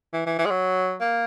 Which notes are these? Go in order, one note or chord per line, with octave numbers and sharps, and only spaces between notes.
E3
E3
E3
G#3
F#3
A#3